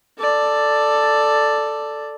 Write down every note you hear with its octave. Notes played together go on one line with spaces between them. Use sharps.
A4 D5